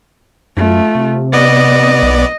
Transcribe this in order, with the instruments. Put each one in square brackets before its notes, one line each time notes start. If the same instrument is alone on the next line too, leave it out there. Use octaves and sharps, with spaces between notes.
[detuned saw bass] F#2 [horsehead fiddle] A3 F4
[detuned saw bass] C3
[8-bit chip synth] B3 D5 [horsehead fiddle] D#5
[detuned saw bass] B1